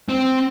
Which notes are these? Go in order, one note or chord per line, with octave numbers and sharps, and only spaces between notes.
C4